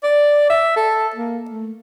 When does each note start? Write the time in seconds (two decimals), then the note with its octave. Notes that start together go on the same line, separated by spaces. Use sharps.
0.04 D5
0.50 E5
0.76 A4
1.16 A#3
1.51 A3